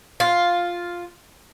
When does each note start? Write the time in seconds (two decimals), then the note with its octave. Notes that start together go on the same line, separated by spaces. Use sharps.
0.20 F4